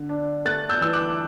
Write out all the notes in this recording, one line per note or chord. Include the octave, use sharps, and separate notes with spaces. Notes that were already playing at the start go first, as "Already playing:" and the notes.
Already playing: D3
D4
A3 F#6 A6
E6 G6
E3 E6
D6 F#6